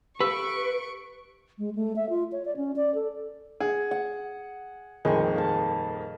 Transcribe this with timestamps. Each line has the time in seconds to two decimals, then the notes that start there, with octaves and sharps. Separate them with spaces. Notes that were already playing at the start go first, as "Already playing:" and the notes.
0.21 G4 A4 B4 F5 C#6 E6 D7
1.58 G#3
1.75 A3
1.96 E5
2.10 F4
2.32 C#5
2.45 D5
2.57 C#4
2.76 D5
2.95 A4
3.60 G#4 F#5
3.91 F#5
5.05 D#1 F2 D#3 G#3 D#5 C#6
5.36 F5 A5